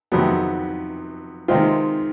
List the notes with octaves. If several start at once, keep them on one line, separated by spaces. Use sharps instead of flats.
F2 C3 D#3 F#3 B3
C3 D#3 G#3 C4 F4